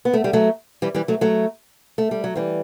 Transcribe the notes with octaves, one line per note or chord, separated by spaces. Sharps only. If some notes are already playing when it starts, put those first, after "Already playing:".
B3
A3
G3
F#3 A3
E3 G3
E3 G3
F#3 A3
F#3 A3
A3
G3
F#3
E3 G3